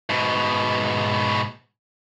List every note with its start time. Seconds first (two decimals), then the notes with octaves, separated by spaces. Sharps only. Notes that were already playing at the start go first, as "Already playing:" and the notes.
0.09 G#2 B2